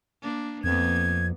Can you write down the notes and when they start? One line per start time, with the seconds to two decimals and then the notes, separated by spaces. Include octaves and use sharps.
0.23 A#3 D4
0.64 F2 A#3 B3 G#6